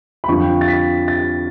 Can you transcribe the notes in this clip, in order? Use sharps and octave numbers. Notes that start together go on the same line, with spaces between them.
B5
F2 D3 F3 C#6
A6
B6
A6